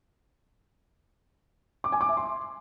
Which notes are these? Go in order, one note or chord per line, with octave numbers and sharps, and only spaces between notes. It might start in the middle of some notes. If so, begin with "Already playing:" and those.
D6
G#5
D6
E5
C6